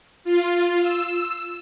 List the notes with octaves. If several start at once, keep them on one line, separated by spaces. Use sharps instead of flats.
F4
E6